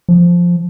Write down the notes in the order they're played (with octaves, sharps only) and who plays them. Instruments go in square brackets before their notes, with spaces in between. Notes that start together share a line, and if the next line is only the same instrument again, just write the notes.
[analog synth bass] F3